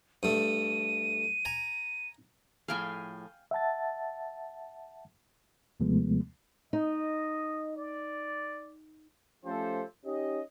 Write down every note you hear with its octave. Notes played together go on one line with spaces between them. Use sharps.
G2 A3 D#7
G#5 A#5
A2 F3 G#4 F5 G5 G#5
E5 F#5 A5 A6
D#2 C3 F3 G#3 A3 B3
D#4 D#5
D5
F3 A3 C#4 G4 A4 C5
C#4 D#4 G4 D#5